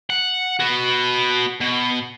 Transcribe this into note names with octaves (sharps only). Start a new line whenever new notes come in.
F#5
B3 F#4
B2